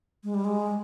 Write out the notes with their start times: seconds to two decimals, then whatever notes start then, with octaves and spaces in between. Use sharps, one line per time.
0.24 G#3
0.34 G3
0.44 G#3